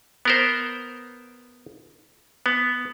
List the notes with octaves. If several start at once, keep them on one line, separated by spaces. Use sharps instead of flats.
B3 A#4 C5
B3